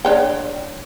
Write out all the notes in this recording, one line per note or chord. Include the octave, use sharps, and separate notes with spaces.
D4 C#5 G5